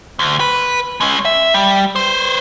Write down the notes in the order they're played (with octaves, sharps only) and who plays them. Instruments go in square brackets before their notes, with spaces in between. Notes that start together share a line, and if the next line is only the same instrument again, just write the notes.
[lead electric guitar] D2
B4
G#3 C#4
E5
G3
B4 C5